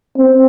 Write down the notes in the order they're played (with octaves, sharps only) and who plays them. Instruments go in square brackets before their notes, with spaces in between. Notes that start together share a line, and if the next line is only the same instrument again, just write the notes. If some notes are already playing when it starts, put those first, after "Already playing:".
[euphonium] C4